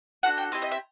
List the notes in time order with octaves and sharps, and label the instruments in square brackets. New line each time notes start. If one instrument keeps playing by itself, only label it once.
[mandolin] D4 F#4 A4 F#5
G5
C4 E4 G4 D#5
D#5
E5